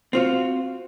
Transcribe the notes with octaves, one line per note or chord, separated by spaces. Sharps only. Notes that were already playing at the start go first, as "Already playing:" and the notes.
C4 F4 F#4